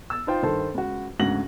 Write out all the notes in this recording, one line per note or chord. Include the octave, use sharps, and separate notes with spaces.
E6 A6
D#4 F4 C5 G5
G2 D#3 A4 C5
C#2 F#4
D2 G#2 C#3 F#4 A#6 F#7